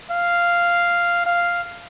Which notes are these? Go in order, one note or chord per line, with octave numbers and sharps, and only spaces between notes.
F5
F5